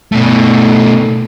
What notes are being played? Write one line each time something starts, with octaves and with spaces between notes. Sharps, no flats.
B2 A3